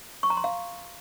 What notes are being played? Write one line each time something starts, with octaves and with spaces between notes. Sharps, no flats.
C#6
A#5
C6
F5